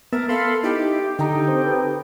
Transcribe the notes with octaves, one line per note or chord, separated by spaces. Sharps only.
B3 A#4 E5 A5
A4 F5 B5 C6
D#4 E4 G4
D3 D#4 G4 A4 G5 A#5
C4 C5
B4